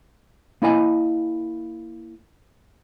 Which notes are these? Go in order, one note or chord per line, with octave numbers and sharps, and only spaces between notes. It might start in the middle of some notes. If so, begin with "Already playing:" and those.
A#3 E4 D#5 G#5